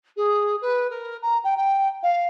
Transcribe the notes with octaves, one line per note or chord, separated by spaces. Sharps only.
G#4
B4
A#4
A#5
G5
G5
F5